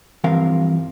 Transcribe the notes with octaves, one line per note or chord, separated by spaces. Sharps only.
G2 E3 F3 C4 A#4 F5